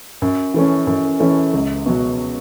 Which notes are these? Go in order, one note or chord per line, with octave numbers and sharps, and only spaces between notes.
F#2
E3 A3 C#4
F#2
E3 A3 C#4
C#2
B2 F#3